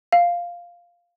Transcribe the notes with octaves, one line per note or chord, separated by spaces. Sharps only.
F5